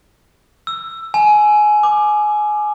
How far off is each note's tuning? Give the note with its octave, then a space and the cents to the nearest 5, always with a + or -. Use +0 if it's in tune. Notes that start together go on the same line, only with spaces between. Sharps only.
E6 +15
G#5 +20
D6 +20